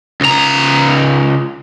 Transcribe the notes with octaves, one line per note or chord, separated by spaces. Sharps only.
C#2 A#5